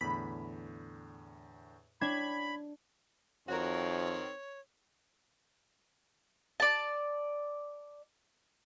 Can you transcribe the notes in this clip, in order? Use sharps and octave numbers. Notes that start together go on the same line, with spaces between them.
E2 A2 D3 B5
D4 C#5 G5 B5 G#6
F2 D#3 C4 F#4 A#4 C#5
D5 A5